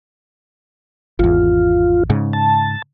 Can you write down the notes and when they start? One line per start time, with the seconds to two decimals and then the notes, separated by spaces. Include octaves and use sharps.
1.19 G#1 E2 F4
2.10 G#2 C#3
2.33 A5